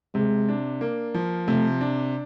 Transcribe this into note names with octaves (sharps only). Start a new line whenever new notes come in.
C3 G#3
D4
A#3
F3
C3 A3
D4